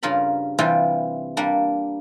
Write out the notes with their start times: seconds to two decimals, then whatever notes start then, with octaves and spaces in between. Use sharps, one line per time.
0.03 G2 C#3 F4 A#4 B5
0.59 C3 E3 G3 F4 G5
1.37 G3 A#3 D4